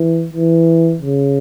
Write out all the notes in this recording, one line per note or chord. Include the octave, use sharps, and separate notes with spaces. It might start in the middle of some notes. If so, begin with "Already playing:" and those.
Already playing: E3
E3
C#3